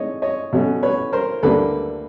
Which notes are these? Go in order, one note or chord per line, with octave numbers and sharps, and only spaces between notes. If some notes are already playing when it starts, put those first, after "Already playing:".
Already playing: A2 G#3 C4 D#4 C#5 D#5
C#5 D#5
B2 F#3 A3 C#4
B4 C#5
A#4 C5
D2 D3 G3 A#3 A4 B4